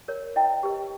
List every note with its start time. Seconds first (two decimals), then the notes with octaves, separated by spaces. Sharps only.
0.08 A#4 C#5
0.36 E4 D#5 G5
0.63 G4 B4